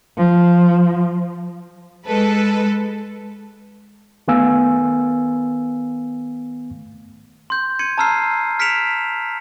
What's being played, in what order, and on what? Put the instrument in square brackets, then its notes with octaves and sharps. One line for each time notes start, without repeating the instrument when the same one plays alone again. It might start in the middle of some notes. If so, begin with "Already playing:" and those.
[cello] F3
[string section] G#3 A4 B4
[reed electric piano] D#3 A3 B3 F5 G#5 E6
[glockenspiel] C6 G6
C6 G#6 C#7 D#7
A5 A#5 E6 F6 C7
F6 B6 C#7 D7 E7 F7